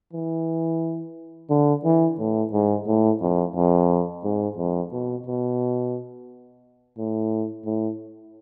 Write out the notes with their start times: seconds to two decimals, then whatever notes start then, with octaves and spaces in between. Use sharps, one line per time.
0.13 E3
1.50 D3
1.84 E3
2.19 A2
2.53 G#2
2.87 A2
3.21 F2
3.55 F2
4.24 G#2
4.57 F2
4.92 B2
5.26 B2
6.97 A2
7.65 A2